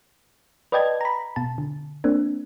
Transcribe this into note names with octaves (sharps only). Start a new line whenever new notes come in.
B4 D5 D#5 G5 A5 G#6
A#5 B5
B2 A5
D3
A#3 C4 D4